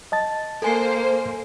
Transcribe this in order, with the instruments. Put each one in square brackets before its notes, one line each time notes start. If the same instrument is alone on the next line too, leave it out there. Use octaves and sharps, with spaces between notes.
[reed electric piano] D#5 A5 A6
[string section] A#3 C5 [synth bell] A4 G#5 C7